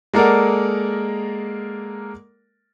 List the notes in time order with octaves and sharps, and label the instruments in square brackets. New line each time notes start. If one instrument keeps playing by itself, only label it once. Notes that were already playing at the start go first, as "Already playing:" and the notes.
[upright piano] G#3 A#3 A4 A#4 D5 F#5